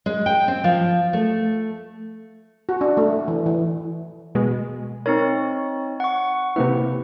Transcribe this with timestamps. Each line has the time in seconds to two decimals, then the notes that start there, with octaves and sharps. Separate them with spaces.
0.06 G#3
0.26 G5
0.48 C4
0.64 F3
1.13 A3
2.69 F#4
2.81 D4
2.97 A3
3.28 E3
3.46 E3
4.35 B2 G#3
5.06 C4 D#4 A#4 C#5
6.00 F#5 C#6
6.56 C3 A#3 E4 B4